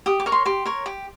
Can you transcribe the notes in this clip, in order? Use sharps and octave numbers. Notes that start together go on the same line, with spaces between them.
G4 D#6
D6
A#4 C#5
C6
G4 C6
A#4 C#5
G4